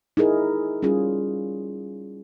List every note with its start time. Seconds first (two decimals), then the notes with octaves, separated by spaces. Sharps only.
0.17 D#4 E4 G#4 A#4
0.82 G3 C#4 F4 G#4